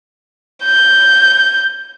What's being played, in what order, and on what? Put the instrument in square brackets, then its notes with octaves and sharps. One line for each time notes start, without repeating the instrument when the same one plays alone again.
[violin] G6